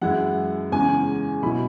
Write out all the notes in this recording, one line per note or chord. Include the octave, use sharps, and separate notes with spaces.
F#2 E3 G#3 E4 F#5
E2 C#3 E3 G#3 C#4 G#5
B2 F#3 E4 B5